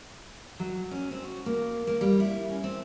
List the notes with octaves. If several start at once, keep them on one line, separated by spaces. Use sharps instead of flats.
F#3
C#4
C4
F#4
A#3
A#3
G3
E4
C#4
C4